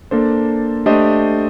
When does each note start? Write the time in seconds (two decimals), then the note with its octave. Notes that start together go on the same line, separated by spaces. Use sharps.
0.11 A#3 D4 A4 C5
0.86 A3 D4 G4 C5 D#5